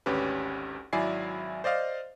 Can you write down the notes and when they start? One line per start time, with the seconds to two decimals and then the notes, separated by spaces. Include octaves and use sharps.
0.06 G#1 D2 C#4 G4 B4
0.93 G#1 F#3 E4 D5 G#5 C7
1.64 C5 D5 D#5 F5